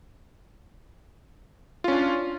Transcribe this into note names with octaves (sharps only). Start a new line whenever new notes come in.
C#4 D4 F4